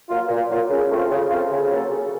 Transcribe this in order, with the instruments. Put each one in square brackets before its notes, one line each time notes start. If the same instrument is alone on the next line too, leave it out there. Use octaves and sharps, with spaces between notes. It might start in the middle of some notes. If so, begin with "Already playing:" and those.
[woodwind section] F#3 A#3 F4
A#2
F#3 A#3 F4
C#3
A3 C4 F4
C#3
A3 C4 F4
C#3
F#3 A#3 C#4 A4
C#3